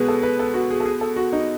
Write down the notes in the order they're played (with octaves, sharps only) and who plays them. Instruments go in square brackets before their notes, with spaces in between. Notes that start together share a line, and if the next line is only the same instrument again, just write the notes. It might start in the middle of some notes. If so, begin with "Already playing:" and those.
Already playing: [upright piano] B2 G#3 B3 [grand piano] G#4 B4
[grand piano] A4
B4
A4
F#4
G#4
A4
G#4
A4
F#4
D#4